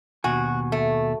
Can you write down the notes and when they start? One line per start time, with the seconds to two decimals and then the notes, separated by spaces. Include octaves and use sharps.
0.24 D#2 B2 F#4 G#5
0.72 A3